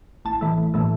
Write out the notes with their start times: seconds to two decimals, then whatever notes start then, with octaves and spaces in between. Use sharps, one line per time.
0.25 A1 A5
0.41 A2 E3 A3
0.58 A1
0.74 A2 E3 A3